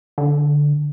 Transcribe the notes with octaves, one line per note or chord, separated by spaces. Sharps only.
D3